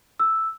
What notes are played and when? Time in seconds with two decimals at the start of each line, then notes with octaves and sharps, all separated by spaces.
0.20 E6